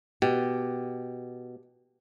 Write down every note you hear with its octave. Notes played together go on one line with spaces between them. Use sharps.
B2 G4